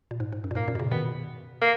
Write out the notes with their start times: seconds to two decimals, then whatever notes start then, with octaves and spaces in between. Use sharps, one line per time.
0.11 A#2
0.20 G#2
0.32 G#2
0.44 F#2
0.51 A#2
0.55 G#2 A#3
0.68 F#2 A#2
0.75 B2
0.79 A#2 C#3
0.91 B2 D#3 B3
1.61 A#3